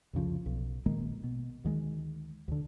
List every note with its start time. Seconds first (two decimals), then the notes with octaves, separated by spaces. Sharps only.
0.13 C2 F2 C#3 F3
0.46 B1
0.86 A#1 D#3 G#3 A#3
1.24 B2
1.64 D2 D#3 G#3
2.48 D2 D3